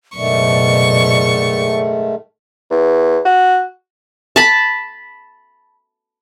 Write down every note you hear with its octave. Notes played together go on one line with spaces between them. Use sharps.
F#1 G#2 B2 D#3 A3 D5 C#6
E2
F#4
A5 B5